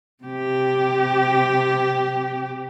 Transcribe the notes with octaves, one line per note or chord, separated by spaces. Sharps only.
C3 G4